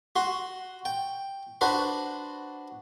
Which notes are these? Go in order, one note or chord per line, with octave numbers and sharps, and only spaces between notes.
F#4 C6
G5
D4 F#4 B4 C5